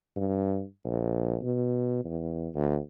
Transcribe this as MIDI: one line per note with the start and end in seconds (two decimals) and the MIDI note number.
0.16 0.64 43
0.85 1.36 34
1.42 2.01 47
2.05 2.48 40
2.55 2.79 38